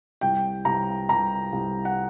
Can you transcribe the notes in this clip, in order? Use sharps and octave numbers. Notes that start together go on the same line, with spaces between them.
C2 G5
C2 A#5
C2 A#5
C2
F#5